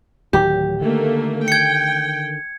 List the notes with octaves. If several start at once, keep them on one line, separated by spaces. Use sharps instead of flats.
D1 D#3 F#3 G4
D3 D#3 A3 A#3
G5 G#6 C#7